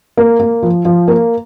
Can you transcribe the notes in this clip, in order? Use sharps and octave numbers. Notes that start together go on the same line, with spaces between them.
A#3
A#3
F3
F3
A#3